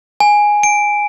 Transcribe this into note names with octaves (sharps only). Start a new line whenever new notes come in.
G#5
D7